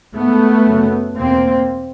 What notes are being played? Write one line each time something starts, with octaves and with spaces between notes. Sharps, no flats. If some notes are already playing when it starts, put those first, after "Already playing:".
G#2 A3 B3
F#2 C#3
E2 B2 A#3 C4